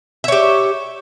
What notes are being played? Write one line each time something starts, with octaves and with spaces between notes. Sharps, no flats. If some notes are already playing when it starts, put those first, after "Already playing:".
G4 C#5 E5